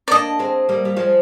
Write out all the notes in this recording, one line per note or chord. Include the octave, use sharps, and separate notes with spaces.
D5
A#3 D4 D#5
G#3 C4
G3 A#3
G3
F3 G#3